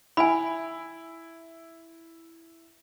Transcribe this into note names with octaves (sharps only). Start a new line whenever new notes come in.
E4 G#5 B5